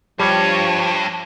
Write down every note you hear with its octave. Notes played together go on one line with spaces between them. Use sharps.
G2 F3 G3 C#5